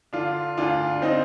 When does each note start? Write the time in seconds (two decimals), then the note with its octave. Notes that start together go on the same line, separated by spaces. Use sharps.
0.13 D3 D4 F4
0.57 D2 D4 F4
1.02 C4 D#4